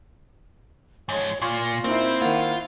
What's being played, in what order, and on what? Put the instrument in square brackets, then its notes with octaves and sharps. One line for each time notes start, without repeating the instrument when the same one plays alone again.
[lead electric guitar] G#2 F3 [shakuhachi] C#5 [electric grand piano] G#5
[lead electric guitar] A#2 [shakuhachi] F4 [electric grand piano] C6 C#6 G#6
[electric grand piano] A#3 D#4 [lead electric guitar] C4 [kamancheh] E4 C5
[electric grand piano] D#3 A#3 [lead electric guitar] F4 [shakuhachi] F#5